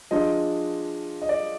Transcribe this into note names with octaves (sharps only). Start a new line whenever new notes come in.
F3 G#3 D4 F4 D#5
D#5
D5